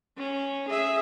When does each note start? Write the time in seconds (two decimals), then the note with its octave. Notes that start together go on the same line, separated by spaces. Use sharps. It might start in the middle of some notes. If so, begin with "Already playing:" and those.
0.17 C#4
0.69 G#4 E5